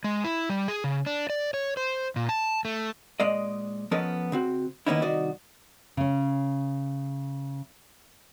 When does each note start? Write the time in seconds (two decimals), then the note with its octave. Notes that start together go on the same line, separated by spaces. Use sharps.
0.04 G#3
0.24 E4
0.50 G3
0.68 G#4
0.84 C#3
1.06 D4
1.30 D5
1.54 C#5
1.77 C5
2.16 A#2
2.29 A5
2.65 A3
3.20 A#2 G#3 D5 D#5
3.91 F3 B3 C#4 A4 A#4 D#5
4.32 C#3 C4 F#4
4.87 D#3 A#3 B3 C#4 D#4 E4
5.02 C2 D#3 F#4 D5 D#5
5.97 C#3 C#4